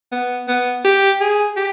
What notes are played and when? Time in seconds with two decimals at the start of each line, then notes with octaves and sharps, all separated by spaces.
0.12 B3
0.48 B3
0.85 G4
1.21 G#4
1.57 G4